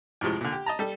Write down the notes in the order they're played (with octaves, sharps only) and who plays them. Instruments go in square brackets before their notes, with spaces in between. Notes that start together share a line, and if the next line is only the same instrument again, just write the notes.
[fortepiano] F2 A2 C3 F3 G#3
A#2 D3
G4
D#5 A5 A#5
G3 A4